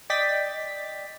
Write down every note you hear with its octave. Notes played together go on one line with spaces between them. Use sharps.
D5 D#5 G5 A6 B6